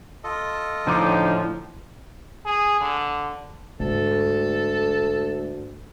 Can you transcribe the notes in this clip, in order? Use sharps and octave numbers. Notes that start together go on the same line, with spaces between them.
F4 A4 D#5
A2 D3 F3 D#4 D6
G#4
D3
D2 G#2 A4